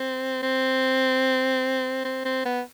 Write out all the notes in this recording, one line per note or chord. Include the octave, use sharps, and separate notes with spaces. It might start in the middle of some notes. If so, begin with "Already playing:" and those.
Already playing: C4
C4
C4
C4
B3